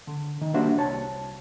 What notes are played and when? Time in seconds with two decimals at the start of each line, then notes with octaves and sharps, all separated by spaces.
0.07 D3
0.41 D#3
0.54 G3 A#3 D4 F#4 C5 E5
0.78 C2 C#5 A5